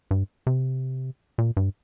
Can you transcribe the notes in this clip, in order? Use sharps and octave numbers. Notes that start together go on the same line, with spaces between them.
G2
C3
A#2
G2